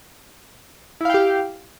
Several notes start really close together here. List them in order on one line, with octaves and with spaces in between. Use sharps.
E4 F5 G5 G4